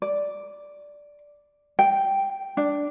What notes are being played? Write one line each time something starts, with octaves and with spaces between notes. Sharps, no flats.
D5
G5
D4